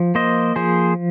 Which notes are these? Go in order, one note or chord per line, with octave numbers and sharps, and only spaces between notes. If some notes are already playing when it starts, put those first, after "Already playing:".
Already playing: F3
A#3 C5 D#5
F3 G#4 C5